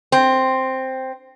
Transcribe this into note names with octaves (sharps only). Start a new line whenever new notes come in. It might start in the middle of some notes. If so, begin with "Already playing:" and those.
C4